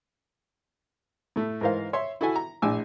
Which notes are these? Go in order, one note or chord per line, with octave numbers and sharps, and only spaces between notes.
A2 A3
G#2 E3 A#4 C5 F5
C#5 E5 C6
E4 F#4 A4 E5 G#5
A#5
A#1 A2 D4 G#5 D6 E6